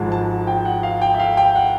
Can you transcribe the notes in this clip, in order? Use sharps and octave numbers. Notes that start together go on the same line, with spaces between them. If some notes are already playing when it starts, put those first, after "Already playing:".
Already playing: G#1 G#2 F3 G#3 A5
A5
G5
F#5
F5
G5
E5
F5
G5
F#5